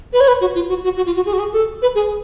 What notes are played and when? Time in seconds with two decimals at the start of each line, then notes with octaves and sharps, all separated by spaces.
0.13 B4
0.20 C#5
0.28 B4
0.41 F#4
0.55 F4
0.69 F#4
0.84 F#4
0.97 F#4
1.06 F4
1.16 F#4
1.26 G#4
1.33 F#4
1.39 G#4
1.53 A4
1.82 B4
1.95 G#4